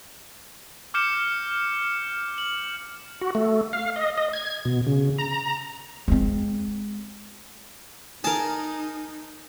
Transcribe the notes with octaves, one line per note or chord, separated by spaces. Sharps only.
D6 F6 G6 C#7 E7
F#7
F#4
A3
F5
D#5
D#5
G#6
B2
C#3
A#5
G#3 C4
D#4 G#4 A#4 A5